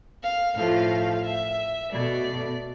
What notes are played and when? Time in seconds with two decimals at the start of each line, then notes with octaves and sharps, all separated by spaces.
0.23 F5
0.56 A2 F3 A3 F5
1.25 E5
1.92 B2 A3 D5